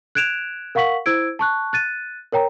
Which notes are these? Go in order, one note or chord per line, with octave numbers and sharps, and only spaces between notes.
F#6 G#6 D7 E7 F7
A#4 F5 F#5 C#6 B6 F#7
E4 C5 E6 G#6 D7
A5 C#6 F#6
F#6 A6 D#7
A#4 C#5 G5 A#5